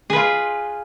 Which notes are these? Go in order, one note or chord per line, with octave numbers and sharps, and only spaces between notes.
F4 G#4 B4